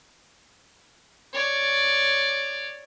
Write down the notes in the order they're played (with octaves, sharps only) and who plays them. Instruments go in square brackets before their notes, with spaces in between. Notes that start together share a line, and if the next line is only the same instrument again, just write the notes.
[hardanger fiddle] C#5 D5